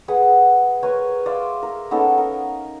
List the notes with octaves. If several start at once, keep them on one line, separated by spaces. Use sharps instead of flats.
G#4 B4 F#5
A#4 B4 C#5 G#5
D5 E5 F5 C6
A#4
B3 C#4 D#4 A4
A#4